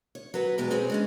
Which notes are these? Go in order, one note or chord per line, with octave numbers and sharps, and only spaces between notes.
C#5
F#3 B4
E2 B2 G#3 G4
C4 G#4 B4 C#5
G#3 C#4 D4